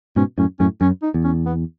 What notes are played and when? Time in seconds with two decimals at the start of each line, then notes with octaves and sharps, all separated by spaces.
0.16 G#2 B2 C#4
0.38 F#2 A2 C#4
0.60 F#2 A2 C#4
0.81 F#2 C#4
1.02 D#4
1.14 E2
1.24 C#4
1.46 B3